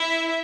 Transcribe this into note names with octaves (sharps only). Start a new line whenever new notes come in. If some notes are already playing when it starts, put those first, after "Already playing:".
Already playing: E4 E5